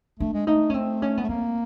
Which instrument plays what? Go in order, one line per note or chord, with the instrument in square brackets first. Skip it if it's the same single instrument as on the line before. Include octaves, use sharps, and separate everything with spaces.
[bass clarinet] A3 [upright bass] D4
[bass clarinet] G#3
[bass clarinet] A3 [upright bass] D#4
[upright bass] C#4
C4
C#4
[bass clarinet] A3 [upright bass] B3
[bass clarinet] A#3 [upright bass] C4